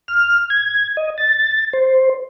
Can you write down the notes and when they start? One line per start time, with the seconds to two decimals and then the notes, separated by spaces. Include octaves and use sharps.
0.08 F6
0.50 G#6
0.97 D#5
1.18 A6
1.73 C5